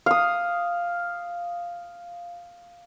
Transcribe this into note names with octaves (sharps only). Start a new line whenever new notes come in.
F5 D#6